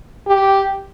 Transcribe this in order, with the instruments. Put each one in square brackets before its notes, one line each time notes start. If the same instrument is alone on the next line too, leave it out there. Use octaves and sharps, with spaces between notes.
[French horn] G4